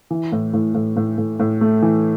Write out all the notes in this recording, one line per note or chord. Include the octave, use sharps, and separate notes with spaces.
E3
A2
A2
A2
A2
A2
A2
A3
E3